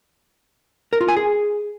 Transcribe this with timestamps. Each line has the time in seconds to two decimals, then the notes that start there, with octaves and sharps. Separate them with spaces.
0.93 A#4
1.01 F4
1.09 G#5
1.17 G#4